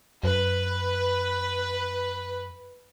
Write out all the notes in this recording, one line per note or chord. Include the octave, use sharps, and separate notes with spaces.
F#2 B4